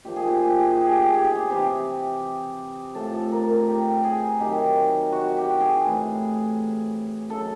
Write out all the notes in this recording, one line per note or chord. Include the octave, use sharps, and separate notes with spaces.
A#2 F3 G4
G#4
G4
G#4
G4
G#4
G4
G#4
G4
G#4
G4
G#4
G4
C3 E3 G4
A2 F3 A4
A4
A#4
A#4
G4
G#4
C3 D#3 F#3 G4
F#4
G4
G#4
A2 E3
C#3 F#3 A4